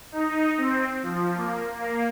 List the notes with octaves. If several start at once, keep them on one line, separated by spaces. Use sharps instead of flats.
D#4
C4
F3
A#3
A#3